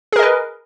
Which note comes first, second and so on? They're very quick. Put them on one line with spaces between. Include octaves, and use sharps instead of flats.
G#4 A#4 D#5 B4